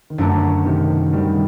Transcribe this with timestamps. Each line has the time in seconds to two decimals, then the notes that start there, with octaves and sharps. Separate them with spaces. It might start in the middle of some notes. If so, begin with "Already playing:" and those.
0.10 D#3
0.18 F#2 D3 F#3 A3 D4
0.66 C3 D#3
1.13 D#3 G3